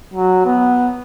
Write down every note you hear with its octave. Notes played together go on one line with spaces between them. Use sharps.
F#3
B3